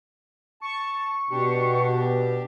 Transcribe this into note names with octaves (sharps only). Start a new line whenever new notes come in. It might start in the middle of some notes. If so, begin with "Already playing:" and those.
A5 C#6
B2 D4 G4